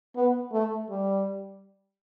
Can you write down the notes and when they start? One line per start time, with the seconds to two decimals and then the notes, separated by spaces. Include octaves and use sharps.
0.16 B3
0.53 A3
0.90 G3